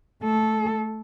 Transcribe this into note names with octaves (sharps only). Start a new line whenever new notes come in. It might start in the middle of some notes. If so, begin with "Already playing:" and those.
A3 A4